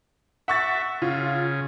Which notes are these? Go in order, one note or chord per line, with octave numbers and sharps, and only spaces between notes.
E5 F#5 C#6 A6
C#3 F4